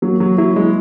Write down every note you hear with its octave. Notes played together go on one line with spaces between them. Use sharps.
F#3 A#3
F#3
F#3 E4
G#3